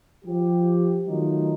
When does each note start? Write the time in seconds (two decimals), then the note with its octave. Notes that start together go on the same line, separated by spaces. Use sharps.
0.25 F3 G4
1.06 D#3 F#3 A3 D#4 F4